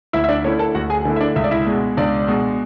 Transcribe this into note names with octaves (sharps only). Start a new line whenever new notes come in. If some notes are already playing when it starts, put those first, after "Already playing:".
D2 E4 E5
E5
D4 D5
D3 A3 C#4 E4 C#5
A4 A5
D2 F#4 F#5
G#4 G#5
D3 A3 E4
E5
D4 D5
C#2 E5
D5
E4 E5
B2 G#3
C#2 D4 D5
B2 G#3